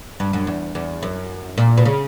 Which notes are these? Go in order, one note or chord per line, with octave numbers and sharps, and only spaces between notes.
G2
F#2
E2
E2
F#2
A#2
B2
C#3